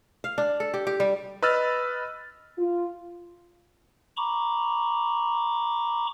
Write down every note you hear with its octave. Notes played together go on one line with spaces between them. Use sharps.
F5
D4
A4
G4
G4
G3
B4 D#5 B5 E6 F6 A6
F4
A#5 B5 C#6 D6